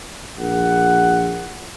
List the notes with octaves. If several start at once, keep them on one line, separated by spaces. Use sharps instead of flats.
A#1 F#5